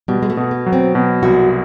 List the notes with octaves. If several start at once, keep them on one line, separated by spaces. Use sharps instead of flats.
B2 G3
G#3
A3
B2
B3
F#3
C4
B2
C2 F#4